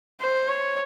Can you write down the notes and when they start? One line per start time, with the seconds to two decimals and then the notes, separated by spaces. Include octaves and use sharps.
0.21 C5
0.49 C#5